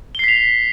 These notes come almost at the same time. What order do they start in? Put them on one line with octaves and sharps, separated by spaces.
G7 C7 B6 F7